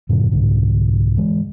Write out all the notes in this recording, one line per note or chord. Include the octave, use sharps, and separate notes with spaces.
F#2 A2 C#3 F3
C2 G#2 D3
E3 G#3